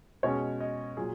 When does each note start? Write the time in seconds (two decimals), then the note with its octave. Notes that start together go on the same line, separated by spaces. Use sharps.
0.23 B2 G#3 C#4 C#5
0.60 D#5
0.97 A#2 F#3 G#4